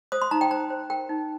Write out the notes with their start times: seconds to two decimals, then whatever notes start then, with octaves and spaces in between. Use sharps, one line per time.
0.12 C5 D#6
0.22 C6
0.31 D#4 A#5
0.41 G5
0.51 C5 A#5
0.70 C5
0.90 A#4 G5
1.09 D#4